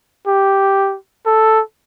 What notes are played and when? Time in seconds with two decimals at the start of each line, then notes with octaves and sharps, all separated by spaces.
0.27 G4
1.26 A4